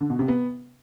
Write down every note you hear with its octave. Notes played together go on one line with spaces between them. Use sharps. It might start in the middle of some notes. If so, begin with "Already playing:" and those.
D3
B2
C3
B3